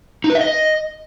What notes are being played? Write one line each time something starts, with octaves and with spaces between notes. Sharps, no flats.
D#4
B4
E5
D#5